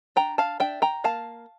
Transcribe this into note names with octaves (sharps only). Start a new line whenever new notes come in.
D4 G5 A#5
F5 A5
D4 E5 G5
G5 A#5
A#3 F5 A5